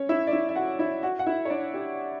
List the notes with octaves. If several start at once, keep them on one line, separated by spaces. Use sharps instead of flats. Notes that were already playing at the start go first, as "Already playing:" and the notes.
Already playing: C#4 C#5
E4 E5
D5
E4 E5
E5
F#4 F#5
E4 E5
F#4 F#5
F#5
E4 E5
C#5
D4 D5
G4